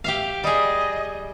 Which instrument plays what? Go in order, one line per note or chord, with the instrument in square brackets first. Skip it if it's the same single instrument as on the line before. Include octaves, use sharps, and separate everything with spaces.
[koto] G4 E5 F5
[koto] G3 G#4 [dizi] D#5